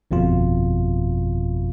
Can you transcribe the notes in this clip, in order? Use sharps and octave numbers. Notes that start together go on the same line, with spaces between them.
G1 F2 B2 F4